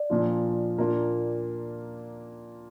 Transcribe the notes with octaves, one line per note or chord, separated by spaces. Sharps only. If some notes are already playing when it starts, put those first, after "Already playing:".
Already playing: D5
A#2 F3 D4 F4
A#2 A#3 D4 F4